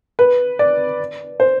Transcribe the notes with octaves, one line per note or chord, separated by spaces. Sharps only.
B4
D5
C5